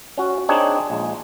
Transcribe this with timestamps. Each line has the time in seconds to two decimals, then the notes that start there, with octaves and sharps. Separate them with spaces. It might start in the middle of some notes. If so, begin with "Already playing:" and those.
0.17 C#4 F#4
0.49 C4 D4 D#4 G#4 C#5
0.90 A#1 G#3